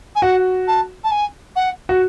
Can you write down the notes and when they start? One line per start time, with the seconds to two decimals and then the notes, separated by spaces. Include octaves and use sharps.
0.16 G#5
0.22 F#4 F#5
0.68 A5
1.04 A5
1.11 G#5
1.56 F#5
1.89 F#4